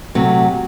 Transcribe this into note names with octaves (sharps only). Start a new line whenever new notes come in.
C3 F#3 A3